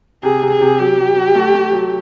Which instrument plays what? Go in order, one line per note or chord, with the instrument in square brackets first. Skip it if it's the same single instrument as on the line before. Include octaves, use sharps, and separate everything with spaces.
[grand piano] C3 [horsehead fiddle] G#4
[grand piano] C3
[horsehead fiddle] G#4
[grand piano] C3
[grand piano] F#3 [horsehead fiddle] G4
[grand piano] F#3
F#3
A3
A3
F#3